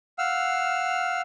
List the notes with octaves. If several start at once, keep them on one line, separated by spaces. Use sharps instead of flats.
F5 F#5 E6 F6